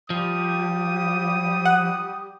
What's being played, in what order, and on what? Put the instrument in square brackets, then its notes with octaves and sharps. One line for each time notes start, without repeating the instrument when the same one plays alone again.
[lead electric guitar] F3 [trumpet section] G3 G4 D#6
[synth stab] F#5